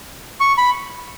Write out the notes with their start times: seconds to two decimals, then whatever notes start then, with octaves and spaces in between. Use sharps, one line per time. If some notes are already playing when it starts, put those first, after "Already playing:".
0.40 C#6
0.58 B5